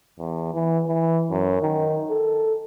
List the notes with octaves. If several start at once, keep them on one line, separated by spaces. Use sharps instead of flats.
E2
E3
E3
F#2
D#3
A4